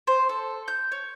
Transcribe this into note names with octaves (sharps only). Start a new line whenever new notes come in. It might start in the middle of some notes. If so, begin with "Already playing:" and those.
C5
A4
G6
C#5